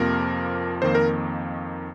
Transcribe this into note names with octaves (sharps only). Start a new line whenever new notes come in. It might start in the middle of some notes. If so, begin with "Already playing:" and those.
Already playing: F2 C3 F3 A#3 A#4
F2 D#3 A#3 C5
A#4